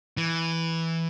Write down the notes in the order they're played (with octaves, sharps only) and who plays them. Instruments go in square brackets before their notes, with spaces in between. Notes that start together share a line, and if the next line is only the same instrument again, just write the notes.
[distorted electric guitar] E3